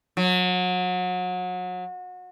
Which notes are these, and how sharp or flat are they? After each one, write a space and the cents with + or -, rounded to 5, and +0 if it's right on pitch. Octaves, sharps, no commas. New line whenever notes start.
F#3 -30